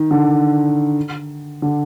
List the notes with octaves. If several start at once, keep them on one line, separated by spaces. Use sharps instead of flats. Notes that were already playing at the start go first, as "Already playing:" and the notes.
Already playing: D#3
D3
D3